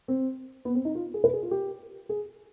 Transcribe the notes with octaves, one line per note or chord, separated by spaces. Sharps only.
C4
B3
C4
D#4
F4
G#4
B4
G#4
F4
G4
G#4